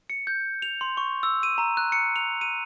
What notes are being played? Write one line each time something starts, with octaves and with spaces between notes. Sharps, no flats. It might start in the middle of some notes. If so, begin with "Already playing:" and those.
C#7
G6
F7
C6
C#6
E6
D#7
A#5
F#6
C#7
F7
D#7